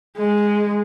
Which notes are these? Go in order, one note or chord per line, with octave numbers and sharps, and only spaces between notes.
G#3